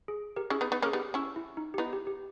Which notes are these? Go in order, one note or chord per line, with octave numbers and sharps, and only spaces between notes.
G#4
G4 A#4
C#4 E4 G#4
B3 D#4
B3 D#4
A#3 C#4
G#4
B3 D#4 G4
C#4 E4
E4
D#4
G4
B3 D#4 E4
G4
G4